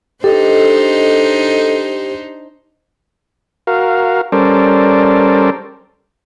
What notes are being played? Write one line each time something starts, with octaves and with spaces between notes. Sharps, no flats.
D4 D#4 G4 A4 C5 D#5
F#4 A#4 F5
G3 C#4 A4 A#4 C5 D5